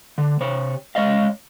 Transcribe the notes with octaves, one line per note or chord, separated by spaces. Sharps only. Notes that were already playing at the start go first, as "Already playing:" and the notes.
D3
C3 C#5
G#3 C#5 D#5 F5